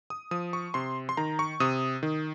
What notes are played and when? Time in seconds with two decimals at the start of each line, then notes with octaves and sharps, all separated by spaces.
0.10 D#6
0.31 F3 D#6
0.53 C#6
0.74 C3 C6
1.09 C6
1.17 D#3 A#5
1.39 C#6
1.60 C3 D#6
2.03 D#3